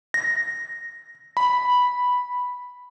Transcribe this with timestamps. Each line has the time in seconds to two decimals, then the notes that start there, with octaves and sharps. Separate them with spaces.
0.14 A#6
1.37 B5